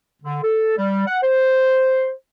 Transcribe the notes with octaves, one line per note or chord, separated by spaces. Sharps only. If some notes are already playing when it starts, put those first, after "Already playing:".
D3
A4
G3
F#5
C5